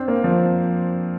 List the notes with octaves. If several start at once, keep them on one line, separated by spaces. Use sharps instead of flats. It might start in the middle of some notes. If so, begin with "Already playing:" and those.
Already playing: C4 D4
A#3
F3